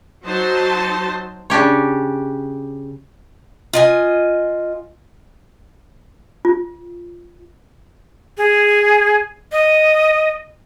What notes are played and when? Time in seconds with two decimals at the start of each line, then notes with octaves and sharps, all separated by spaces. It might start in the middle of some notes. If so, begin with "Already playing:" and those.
0.24 F#3 D#4 C5 A5
1.50 C#3 D4 G4 C#5
3.73 F4 D#5 G#5
6.45 F4
8.38 G#4
9.52 D#5